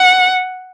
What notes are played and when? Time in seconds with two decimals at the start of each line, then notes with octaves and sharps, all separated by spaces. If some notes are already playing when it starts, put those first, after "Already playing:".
Already playing: F#5